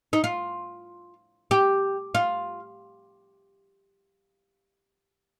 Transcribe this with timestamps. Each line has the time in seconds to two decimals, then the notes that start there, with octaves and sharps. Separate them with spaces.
0.13 D#4
0.24 F4
1.51 G4
2.15 F4